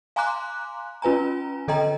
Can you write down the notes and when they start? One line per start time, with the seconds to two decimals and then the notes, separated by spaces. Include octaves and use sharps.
0.16 F5 G#5 A#5 C6 D6 F#6
1.02 C#4 F4 B4 G#5 A#5
1.68 D3 A4 D#5 G5 A#5